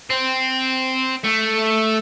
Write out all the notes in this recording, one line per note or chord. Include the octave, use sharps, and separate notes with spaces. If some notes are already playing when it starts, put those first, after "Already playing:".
C4
A3